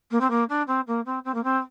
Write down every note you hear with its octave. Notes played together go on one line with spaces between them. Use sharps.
A#3
C4
A#3
D4
C4
A#3
C4
C4
A#3
C4